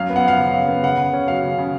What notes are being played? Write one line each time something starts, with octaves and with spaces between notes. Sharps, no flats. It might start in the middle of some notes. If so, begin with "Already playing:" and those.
Already playing: F#2 F5
B3
F#5
F3 F5
C#3
F#2
B3
C#3 F#5
C#3
C#4
F#3 F5
C#3
C#3